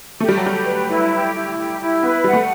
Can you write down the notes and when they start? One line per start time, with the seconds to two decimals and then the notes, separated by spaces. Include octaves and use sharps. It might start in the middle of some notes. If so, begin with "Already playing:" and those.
0.20 A3 G4
0.29 G3
0.37 F#3
0.43 G3 G4
0.65 B4
0.89 E4
1.12 G4
1.34 E4
1.57 G4
1.80 E4
2.03 B3 B4
2.24 G3 F#5
2.33 A3